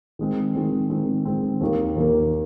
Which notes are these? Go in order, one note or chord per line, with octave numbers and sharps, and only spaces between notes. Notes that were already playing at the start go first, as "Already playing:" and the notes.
D#3 G#3 C4
D#3 G#3 C4
D#3 G#3 C4
D#3 G#3 C4
D#2 D#3 A#3
D#2 D#3 A#3